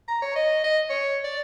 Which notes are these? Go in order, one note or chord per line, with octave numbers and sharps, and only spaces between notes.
A#5
C#5
D#5
D#5
C#5
D5